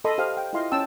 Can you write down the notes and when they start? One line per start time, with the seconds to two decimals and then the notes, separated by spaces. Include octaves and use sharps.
0.05 A4 D#5 B5 C6 D#6
0.18 G4 C5 F5
0.37 G5
0.53 E4 F4 D#5 F5 C6
0.72 C#4 G5 A5 E6